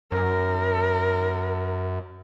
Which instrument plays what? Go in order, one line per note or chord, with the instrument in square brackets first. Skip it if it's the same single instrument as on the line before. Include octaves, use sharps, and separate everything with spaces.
[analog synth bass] F#2 [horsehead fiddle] A#4